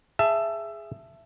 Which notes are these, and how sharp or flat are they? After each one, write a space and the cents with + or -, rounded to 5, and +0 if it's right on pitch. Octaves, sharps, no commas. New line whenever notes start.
G#4 +0 E5 +15 A5 +0